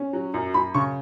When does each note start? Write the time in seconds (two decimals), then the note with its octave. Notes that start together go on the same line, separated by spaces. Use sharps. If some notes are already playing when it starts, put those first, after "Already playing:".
Already playing: C#4
0.13 F#3
0.34 F#2
0.54 F#2 B5
0.74 C#3 C#6